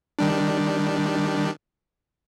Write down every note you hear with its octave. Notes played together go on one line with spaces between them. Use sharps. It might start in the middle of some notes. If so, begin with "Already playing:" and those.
D#3 G3 D4